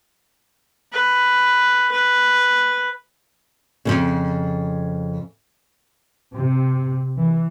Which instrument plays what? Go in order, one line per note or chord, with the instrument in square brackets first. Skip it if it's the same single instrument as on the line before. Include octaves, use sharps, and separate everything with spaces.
[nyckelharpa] B4
B4
[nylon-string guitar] F2 A2 C#3
[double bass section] C3
E3